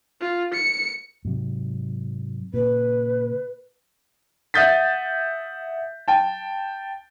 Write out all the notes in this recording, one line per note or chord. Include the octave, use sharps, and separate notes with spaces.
F4
C#7
G#2 C3 F#3
A#2 C#3 B4
E5 F#5 D#6 G6 A6 B6
G5 A5